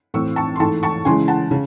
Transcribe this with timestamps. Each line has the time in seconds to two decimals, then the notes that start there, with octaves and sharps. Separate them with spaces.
0.14 A2 E3 C4 C#6 E6
0.36 A5 C#6
0.56 C6
0.60 G#2 E3 A3 A5 C#6
0.83 A5 C#6
1.05 C#3 E3 G#3 G#5 C6
1.28 F#5 A5
1.51 C#3